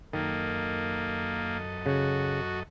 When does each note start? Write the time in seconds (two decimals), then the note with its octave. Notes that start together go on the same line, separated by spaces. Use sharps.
0.13 F#2 D#3 A#3 A4 D#5
1.86 C#3 F#4